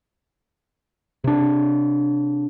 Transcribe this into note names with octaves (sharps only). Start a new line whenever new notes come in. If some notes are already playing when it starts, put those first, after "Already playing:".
C3 D4